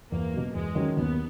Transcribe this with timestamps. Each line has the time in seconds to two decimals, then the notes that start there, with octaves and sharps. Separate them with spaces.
0.12 E2 A#3
0.34 B2 F#3
0.55 E2 G#3
0.75 D#3 F#3 C#4
0.97 D#2 B3